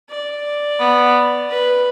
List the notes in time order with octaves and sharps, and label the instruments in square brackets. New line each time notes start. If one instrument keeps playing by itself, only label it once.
[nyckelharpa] D5
[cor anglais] B3
[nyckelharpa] B4